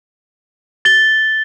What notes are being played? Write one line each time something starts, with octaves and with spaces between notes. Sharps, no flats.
A6 G7